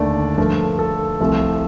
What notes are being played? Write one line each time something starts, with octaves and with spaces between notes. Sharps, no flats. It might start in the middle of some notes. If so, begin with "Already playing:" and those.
Already playing: D#2 D3 A3 D5
G2 F3 A3 A#4
A4
C2 C3 F3 A3